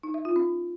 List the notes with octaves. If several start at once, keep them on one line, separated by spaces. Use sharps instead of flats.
D#4
E5
F4
C#4